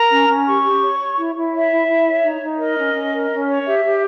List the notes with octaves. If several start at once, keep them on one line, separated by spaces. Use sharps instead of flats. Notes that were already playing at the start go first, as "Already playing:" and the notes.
Already playing: A#4 A#5
C#4
C#4
G4 C#6
G4
C#5
C#5
E4
E4
C#5 E5
E4
E4
C#5
D#4
D#4
A#4 D#5
C#4
C#4
A#4
C#4
C#5
G4 E5
G4